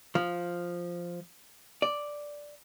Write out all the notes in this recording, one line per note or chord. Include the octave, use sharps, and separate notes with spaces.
F3
D5